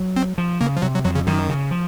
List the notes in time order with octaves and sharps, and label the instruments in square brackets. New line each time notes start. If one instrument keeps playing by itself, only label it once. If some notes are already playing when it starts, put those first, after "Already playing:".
Already playing: [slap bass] F#3
[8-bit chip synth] C4
[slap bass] F3
[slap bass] C#3 [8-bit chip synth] A#3
[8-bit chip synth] F3
[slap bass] C3 [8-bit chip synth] F#3
[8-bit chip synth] F#3
[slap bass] F2 [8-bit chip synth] F#3
[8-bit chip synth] C#3
[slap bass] F#2 [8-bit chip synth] D#3
[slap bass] C#3
F3